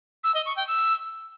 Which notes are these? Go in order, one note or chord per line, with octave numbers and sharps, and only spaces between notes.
E6
D#5
C#6
G5
E6